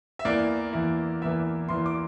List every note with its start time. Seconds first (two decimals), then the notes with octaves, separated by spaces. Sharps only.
0.19 E5
0.25 E2 E3 A#3 E4 D5
0.73 E2 E3 A#3 E4
1.22 E2 E3 A#3 E4 E5
1.69 E2 E3 A#3 E4 C6
1.86 D6